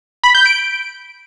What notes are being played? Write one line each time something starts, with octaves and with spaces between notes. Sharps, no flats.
B5
G6
D7